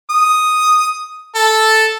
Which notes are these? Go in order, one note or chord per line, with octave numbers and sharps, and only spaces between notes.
D#6
A4